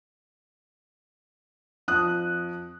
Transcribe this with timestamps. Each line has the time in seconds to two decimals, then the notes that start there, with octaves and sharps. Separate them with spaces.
1.88 F2 D#6 F#6